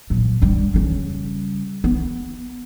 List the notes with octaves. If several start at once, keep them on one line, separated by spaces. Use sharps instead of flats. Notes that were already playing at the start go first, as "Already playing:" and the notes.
A#2 F#3
D3 G3
C#3 G3
B3